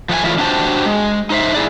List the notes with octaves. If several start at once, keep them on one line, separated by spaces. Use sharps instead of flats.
F3 A3 F#5 G#5
A2 E3 E4 F4
D4 F#4 G4 C5 A5
G#3
D#4 C5 E5
E4 G#4 D5